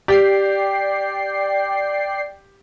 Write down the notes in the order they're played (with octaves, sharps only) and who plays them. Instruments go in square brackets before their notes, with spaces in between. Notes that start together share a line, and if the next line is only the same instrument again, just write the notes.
[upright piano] G4 [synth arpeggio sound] D5 G5 C7